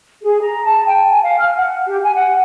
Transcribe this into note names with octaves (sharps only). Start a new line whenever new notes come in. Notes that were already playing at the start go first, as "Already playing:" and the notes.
G#4
A#5
A5
G5
G#5
F5
F6
F#5
G4
G#5
F#5